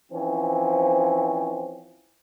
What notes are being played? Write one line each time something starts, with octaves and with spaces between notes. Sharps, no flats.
E3 F3 C4 C#4